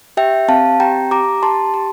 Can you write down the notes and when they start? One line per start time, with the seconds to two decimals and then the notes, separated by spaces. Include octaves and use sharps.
0.17 G4 E5 G5
0.48 C4 F5 A5
0.80 G4 G5 A#5
1.11 G4 A#5 D6
1.43 G4 A5 C6
1.74 G4